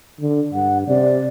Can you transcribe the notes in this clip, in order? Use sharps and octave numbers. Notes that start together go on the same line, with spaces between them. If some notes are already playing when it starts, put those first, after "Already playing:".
D3
G2 F#5
C3 D5